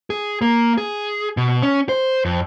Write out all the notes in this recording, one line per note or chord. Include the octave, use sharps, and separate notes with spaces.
G#4
A#3
G#4
B2
C#4
C5
F2